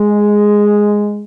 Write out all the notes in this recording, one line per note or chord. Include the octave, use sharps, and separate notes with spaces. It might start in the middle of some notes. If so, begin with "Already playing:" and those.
Already playing: G#3